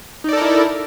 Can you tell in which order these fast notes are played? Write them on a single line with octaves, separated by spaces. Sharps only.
D#4 D5 A4 A#4 E4